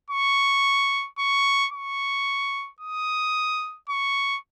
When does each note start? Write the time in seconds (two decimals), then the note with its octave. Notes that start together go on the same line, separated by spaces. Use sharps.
0.10 C#6
1.19 C#6
1.73 C#6
2.80 D#6
3.90 C#6